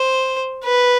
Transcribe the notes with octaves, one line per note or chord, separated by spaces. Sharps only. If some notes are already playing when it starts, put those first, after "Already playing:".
Already playing: C5
B4